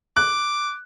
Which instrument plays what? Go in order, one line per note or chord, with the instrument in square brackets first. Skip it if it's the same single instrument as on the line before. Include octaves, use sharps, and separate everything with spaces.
[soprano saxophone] D6 [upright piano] F#6